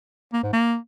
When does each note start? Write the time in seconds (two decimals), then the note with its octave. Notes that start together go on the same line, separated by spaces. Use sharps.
0.33 A#3
0.43 G#2
0.53 A#3